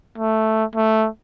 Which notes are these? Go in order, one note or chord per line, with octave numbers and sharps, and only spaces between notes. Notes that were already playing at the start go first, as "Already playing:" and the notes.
A3
A3